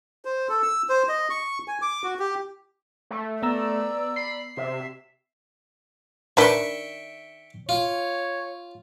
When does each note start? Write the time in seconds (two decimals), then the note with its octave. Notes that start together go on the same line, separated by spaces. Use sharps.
0.25 C5
0.49 A4
0.62 E6
0.89 C5
1.09 D#5
1.30 C#6
1.68 G#5
1.82 D6
2.03 F#4
2.19 G4
3.11 A3
3.43 B3 D5 A#5 E6
4.16 B5 C7
4.57 C3 E5
6.37 D#3 D4 B4 E5 G5 C#6
7.69 F4 C#5